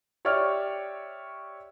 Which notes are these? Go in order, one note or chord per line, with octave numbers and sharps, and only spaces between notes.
G4 C#5 D5 E5 C#6 F6